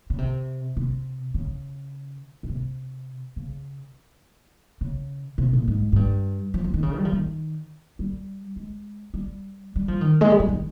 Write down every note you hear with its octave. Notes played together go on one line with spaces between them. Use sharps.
C#3
C3
C3
C#3
A#2
C3
C#3
C#3
C3
A#2
G#2
G#2
G2
F3
F3
D#3
C#3
G3
F3
D#3
G3
G#3
G3
G3
F3
D#3
G#3
G3
F3
D#3